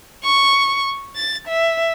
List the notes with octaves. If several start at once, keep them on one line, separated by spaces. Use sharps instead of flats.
C#6
A6
E5